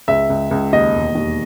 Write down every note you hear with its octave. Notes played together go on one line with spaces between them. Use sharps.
C#2 E5
C#2
C#2
D#2 D#5
E1
D#2